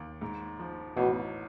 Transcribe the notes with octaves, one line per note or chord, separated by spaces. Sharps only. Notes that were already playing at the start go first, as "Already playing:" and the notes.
Already playing: D#2
G#2
F3
A1 B2